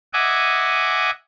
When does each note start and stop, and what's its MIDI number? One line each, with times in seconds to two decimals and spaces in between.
0.13 1.11 75
0.13 1.11 76
0.13 1.11 78
0.13 1.11 80
0.13 1.11 86